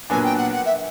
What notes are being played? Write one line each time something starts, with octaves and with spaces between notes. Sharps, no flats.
A#2 F#3 B3 D4 G#5
G5
F#5
F#5
E5